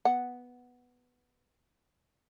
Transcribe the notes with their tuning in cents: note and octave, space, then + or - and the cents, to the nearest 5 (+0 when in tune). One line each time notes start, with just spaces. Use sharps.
B3 +0 F#5 +0